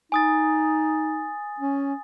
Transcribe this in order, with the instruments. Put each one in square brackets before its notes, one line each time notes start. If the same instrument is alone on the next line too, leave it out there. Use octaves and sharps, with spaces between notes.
[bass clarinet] D#4 [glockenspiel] G#5 D#6 A6
[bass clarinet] C#4